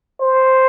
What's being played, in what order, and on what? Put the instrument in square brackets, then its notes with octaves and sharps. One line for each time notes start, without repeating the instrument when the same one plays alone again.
[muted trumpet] C5